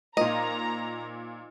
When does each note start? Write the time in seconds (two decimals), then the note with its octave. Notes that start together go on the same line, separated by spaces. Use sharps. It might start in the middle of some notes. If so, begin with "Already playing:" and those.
0.17 A#2 A#3 D#4 F4 C5 D#5 A#5